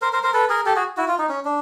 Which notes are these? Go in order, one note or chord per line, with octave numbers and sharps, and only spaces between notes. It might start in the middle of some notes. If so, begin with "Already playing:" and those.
A#4 C5
A#4 C5
A#4 C5
A4 B4
G#4 A#4
G4 A4
F#4 G#4
E4 F#4
F4
D#4
C#4
D4